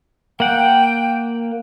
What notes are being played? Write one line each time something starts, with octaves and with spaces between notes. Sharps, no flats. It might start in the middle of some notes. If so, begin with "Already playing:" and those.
A#3 F#5 G5